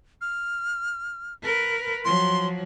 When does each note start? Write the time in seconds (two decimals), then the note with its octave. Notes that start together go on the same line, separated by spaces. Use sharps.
0.21 F6
1.43 A#4 B4
2.05 F3 F#3 C6